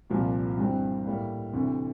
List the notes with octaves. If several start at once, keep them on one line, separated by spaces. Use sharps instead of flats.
C2 A#2 F3 A#3
G2 E3 G3 C4
A2 G3 A#3
D2 C3 E3